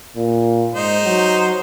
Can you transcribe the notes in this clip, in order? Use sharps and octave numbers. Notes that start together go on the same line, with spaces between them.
A#2
G#2 D#4 C5
F#3